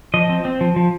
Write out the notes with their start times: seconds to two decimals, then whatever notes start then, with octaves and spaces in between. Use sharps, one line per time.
0.14 F3 D#5
0.29 C4
0.45 C4
0.61 F3
0.76 F3